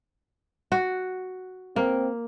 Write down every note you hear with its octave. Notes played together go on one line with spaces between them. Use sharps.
F#4
A#3 C4